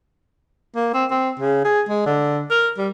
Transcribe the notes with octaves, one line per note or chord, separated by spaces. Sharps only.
A#3
C4
C4
C#3
G#4
G#3
D3
A#4
G3